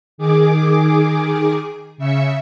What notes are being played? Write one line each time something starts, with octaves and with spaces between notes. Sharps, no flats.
D#3 G#4 D6
C#3 E5 C#7